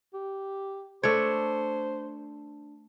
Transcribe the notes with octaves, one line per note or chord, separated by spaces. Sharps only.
G4
A3 D4 C5 C#5